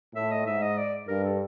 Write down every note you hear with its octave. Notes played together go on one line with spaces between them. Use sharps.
A2 E5
D#5
G#2 E5
D#5
D5
G2 A#4
A4